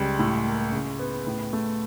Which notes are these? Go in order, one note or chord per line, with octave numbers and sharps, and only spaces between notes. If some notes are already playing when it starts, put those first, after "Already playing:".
Already playing: C#2 G3
A2
A#3
C#3
B3
A2
A3